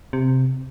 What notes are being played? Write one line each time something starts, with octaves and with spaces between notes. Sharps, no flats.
C3